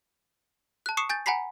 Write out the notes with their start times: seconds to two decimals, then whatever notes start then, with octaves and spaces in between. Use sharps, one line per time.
0.86 A5 F#6
0.97 C#6 D#6 C7 C#7 E7
1.10 G#5 G6 A6
1.26 F#5 G#5 A#5 B5 B6 C7